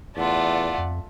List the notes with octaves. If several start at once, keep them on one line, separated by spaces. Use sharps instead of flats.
E2 A3 F4 D5 F#5
F2